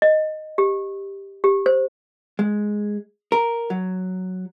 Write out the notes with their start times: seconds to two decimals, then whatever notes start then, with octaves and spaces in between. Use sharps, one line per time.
0.02 D#5
0.58 G4
1.44 G4
1.66 C5
2.39 G#3
3.32 A#4
3.70 F#3